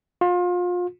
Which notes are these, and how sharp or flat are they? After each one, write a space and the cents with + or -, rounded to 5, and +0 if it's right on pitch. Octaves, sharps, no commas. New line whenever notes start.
F4 +30